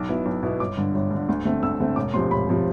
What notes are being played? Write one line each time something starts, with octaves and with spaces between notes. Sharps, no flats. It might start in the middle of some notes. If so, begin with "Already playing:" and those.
Already playing: B1 D6
B2 B3 E4
B1
B2 B3 E4
G1 D6
G2 D3
G1
G2 D3
D2
D3 A3 C4
D2 E6
D3 A3 C4
E1 D6
D2 C3 F3 C6
E1 B5
C3 F3